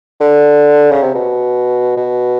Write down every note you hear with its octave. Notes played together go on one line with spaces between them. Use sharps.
D3
C#3
C3
B2
B2